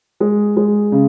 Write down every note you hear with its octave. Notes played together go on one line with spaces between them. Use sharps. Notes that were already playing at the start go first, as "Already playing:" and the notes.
G#3
G#3
C#3